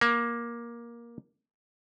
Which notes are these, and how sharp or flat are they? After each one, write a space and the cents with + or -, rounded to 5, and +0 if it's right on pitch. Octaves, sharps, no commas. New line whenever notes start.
A#3 +15